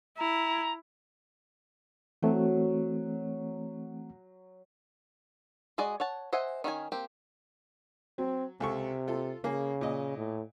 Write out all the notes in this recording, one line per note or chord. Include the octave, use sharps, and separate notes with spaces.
E4 A#5
E3 F#3 A3 C4
G#3 F#4 G#4 D5 D#5
C#5 F#5 A5
C5 D#5 E5 F#5 G#5
D#3 C#4 D#4 G#5
A#3 C4 G4
F#3 C4
C#2 C3 A4 C#6
F4 A4
C#3 A#3 G#4
A#2 D#5
A2